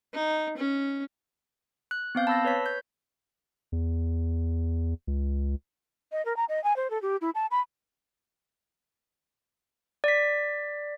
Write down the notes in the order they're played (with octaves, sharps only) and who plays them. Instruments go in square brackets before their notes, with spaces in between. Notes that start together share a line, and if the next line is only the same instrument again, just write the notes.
[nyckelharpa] D#4
C#4
[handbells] F#6
B3 C4 F5 G6
A5 B5 E6 A6 A#6
B4 C#5 B6
G6
[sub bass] E2
C#2
[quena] D#5
A#4
A#5
D#5
G#5
C5
A4
G4
E4
A5
B5
[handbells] D5 B6